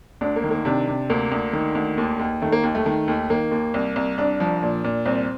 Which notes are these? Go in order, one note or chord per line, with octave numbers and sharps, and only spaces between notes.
D2 D4
A#3
D#3
A#3
C3 D4
C3
D2 A#3
D2
D#3
D2
D#2
D#2
D#3 A3
A#3
D#2
A3
D#3
D#2
D#3 A#3
D#2
C2
C2
C2 D4
F3
A#2
A#2
C2 C4